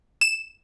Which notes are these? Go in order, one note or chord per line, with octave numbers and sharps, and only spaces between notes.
E7